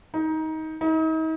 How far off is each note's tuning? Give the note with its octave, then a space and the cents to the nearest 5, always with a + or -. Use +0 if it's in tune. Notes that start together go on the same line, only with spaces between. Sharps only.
D#4 +20
D#4 +40